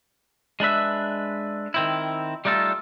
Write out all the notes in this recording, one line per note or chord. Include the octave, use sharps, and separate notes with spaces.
G#3 D4 B4 E5
D#3 C4 E4
G3 A3 D#4 F4 A4